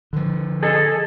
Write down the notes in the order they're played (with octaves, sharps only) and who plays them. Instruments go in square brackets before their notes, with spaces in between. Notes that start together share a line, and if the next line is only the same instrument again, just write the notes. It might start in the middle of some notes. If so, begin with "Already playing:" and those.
[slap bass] D3 F3
[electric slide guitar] G#4 A4 D#5